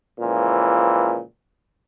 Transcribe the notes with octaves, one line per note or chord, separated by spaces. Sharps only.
C#2 A#2 E3 F3